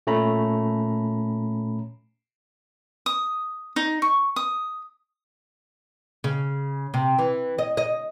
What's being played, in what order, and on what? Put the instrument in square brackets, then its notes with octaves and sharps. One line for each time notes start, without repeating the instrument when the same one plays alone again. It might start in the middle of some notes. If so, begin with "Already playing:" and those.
[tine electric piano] A#2 A3 C#4 A#5 B5
[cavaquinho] D#6
D#4
C#6
D#6
[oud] C#3
C3
E3
D#5
D#5